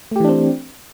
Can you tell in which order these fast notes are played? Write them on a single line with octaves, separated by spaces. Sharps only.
A3 G4 E3 D4 C4